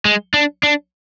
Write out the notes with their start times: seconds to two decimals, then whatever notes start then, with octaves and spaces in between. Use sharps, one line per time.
0.05 G#3
0.34 D4
0.63 D4